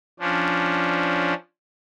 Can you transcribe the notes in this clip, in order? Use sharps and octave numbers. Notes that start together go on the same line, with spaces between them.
F3 C#4 D4